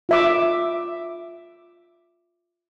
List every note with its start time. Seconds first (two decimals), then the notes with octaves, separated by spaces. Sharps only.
0.09 F4 E5 D6